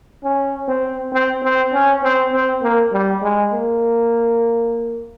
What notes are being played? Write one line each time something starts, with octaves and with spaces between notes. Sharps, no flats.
C#4
C4
C4
C4
C#4
C4
C4
A#3
G3
G#3
A#3